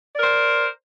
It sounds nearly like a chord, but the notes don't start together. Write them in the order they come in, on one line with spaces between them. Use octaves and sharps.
D5 A#4 C5